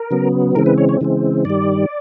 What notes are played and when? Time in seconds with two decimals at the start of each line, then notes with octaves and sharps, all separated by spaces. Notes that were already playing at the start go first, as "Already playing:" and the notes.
Already playing: A#4
0.11 C#3 F#3 B3
0.55 C#3 E3 G#3 C4 A#4
0.66 B4
0.78 C#5
0.89 C#5
1.01 C#3 E3 G#3 C4
1.45 G2 D#3 G3 D5